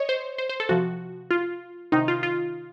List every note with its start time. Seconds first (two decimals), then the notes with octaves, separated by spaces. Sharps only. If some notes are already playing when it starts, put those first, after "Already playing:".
Already playing: C#5 D#5
0.09 C5
0.38 C5
0.49 C5
0.60 A4
0.69 C3 F3 F#4
1.31 F4
1.92 C3 D#3 D#4
2.08 F4
2.23 F4